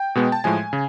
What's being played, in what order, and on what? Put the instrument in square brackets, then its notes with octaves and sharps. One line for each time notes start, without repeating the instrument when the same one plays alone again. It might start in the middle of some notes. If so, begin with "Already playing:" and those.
Already playing: [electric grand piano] G5
B2 G#3 B3
A5
A2 F3 G#3 G#5
C#3